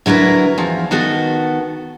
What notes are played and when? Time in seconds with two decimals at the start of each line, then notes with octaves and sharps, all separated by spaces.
0.06 D3 F#3 E4 A#4 B4
0.58 E2 F3
0.91 D#3 B3 F#4 A4